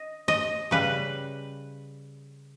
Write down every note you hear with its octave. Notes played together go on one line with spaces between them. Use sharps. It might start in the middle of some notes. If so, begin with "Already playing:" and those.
Already playing: D#5
D#5
C#3 G3 B4